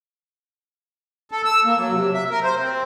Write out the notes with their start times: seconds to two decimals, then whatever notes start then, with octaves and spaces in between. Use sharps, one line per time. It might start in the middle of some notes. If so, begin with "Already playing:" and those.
1.31 A4
1.45 E6
1.65 A#3
1.78 F#3
1.92 C3
2.14 E5
2.30 A#4
2.44 C5
2.60 C4